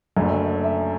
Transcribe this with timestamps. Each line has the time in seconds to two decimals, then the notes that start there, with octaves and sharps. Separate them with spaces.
0.17 F#1 F#2 D3 A3
0.64 E5